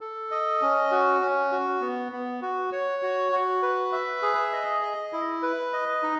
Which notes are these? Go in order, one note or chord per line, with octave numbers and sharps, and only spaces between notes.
A4
D#5
C#4
F#4
C#4
F#4
B3
B3
F#4
C#5
F#4
F#4
B4
E5
G#4
D#5
D#5
E4
B4
D#5
D#4